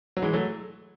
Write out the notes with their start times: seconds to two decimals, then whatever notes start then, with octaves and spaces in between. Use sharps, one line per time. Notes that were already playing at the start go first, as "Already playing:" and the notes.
0.17 F#3
0.22 E3 G#3
0.33 F#3 A3